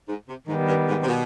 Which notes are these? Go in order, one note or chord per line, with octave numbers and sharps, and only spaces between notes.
G#2
C3
G#2 D#3 G3 B3
G2
G#2
C3
B2